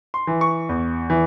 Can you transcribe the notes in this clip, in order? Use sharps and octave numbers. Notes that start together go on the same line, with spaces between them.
C6
E3
C#6
E2
E3